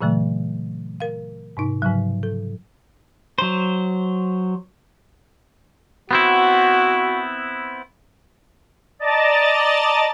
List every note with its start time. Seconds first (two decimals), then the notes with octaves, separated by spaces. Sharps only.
0.01 A#2 C#3 E3 F#3 A3
1.00 A#4 F5
1.57 G#2 C3 D#4
1.82 G#2 C#3 F3 F#3
2.23 A4
3.38 F#3 C5
6.11 B3 C4 E4 F#4
8.99 D5 D#5 A5 A#5 A6